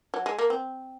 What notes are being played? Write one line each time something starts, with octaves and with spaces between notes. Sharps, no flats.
F#3
G#3
A#3
C4